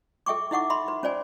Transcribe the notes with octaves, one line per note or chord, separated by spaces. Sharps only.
A4 E5 G5 C#6 D6
D#4 E4 E5 F#5 C#6 D6
E5 B5 C6
B4
C#4 C5 D5 G#5